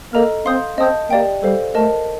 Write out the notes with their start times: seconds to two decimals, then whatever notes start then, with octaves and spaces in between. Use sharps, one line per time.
0.13 A#3 A4 D#5 A#5 F6
0.46 C4 F5 C6 D#6 G6
0.78 C4 D#5 A5 D#6 G6
1.10 A#3 G4 D5 G5
1.43 G3 A4 C5 F5
1.75 A3 A#4 D#5 A5